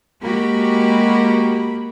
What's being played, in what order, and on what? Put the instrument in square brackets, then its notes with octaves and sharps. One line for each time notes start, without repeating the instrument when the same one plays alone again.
[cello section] G#3 F#4 G4 [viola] A#3 B5